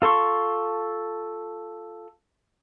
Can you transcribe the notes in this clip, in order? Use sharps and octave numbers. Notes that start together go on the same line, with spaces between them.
F4 A4 C6 C#6